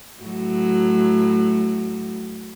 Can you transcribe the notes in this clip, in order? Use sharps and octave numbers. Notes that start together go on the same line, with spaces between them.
A2 F#3